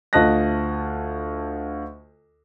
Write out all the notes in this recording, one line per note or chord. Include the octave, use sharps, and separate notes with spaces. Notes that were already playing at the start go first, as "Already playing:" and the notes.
D2 F4 D#5 A5 F#6 A#6